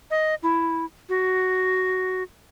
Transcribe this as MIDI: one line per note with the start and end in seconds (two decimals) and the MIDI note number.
0.11 0.35 75
0.43 0.85 64
1.09 2.23 66